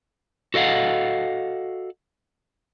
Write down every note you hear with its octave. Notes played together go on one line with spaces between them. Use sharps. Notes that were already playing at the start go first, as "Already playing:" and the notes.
F#4 A4 D#5 F5 F#5